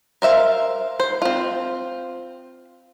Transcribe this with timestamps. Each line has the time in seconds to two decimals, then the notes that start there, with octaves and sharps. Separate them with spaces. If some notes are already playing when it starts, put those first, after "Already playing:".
0.22 A#4 C5 E5 F5
1.00 C5
1.22 C4 F4